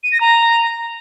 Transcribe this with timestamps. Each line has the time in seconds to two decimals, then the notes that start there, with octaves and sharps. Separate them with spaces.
0.03 D#7
0.12 A#6
0.21 A#5